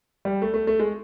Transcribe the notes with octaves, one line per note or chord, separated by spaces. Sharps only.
G3
A3
A3
A3
G#3